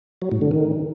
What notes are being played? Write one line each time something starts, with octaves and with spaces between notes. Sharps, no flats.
F#3
A2
D3
D#3